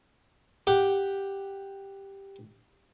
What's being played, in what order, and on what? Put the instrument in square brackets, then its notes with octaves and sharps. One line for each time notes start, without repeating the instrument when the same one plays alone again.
[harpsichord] G4 F#5